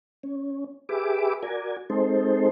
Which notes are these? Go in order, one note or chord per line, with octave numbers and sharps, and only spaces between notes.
C#4
G4 G#4 B4 E5 D6
F#4 A#4 D5 G#5
G#3 C4 D#4 A4 C5